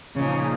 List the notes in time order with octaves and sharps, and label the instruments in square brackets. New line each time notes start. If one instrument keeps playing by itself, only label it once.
[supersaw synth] A#2 F3 A#3 D#4 G#4 [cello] C#3